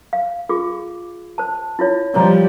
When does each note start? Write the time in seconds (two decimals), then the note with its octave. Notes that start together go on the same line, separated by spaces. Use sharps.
0.13 F5
0.49 F4 G#4 D6
1.38 C5 A5
1.79 E4 F4 C#5
2.14 F3 G3 C#5 A#5